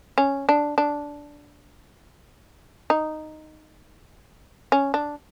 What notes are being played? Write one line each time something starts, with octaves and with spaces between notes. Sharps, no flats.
C#4
D4
D4
D#4
C#4
D4